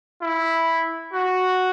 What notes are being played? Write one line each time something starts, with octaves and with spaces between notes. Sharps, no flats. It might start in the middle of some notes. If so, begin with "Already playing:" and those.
E4
F#4